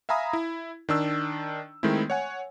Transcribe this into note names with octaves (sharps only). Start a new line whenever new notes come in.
E5 F5 G#5 A#5 B5 D#6
E4
D#3 D4 E6
D#3 G#3 A3 C4 E4
C#5 F#5 G#5